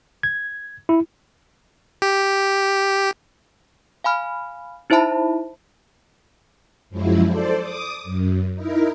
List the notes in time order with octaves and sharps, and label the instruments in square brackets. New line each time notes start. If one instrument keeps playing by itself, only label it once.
[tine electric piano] G#6
E4
[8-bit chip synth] G4
[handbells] F5 G#5 B5 F6
D#4 E4 C5 E5 A5 B5
[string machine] F#2 F3 F#3 G#3 E4
A4 C5 D5
D6 D#6
F#2
D#4 E4 A#4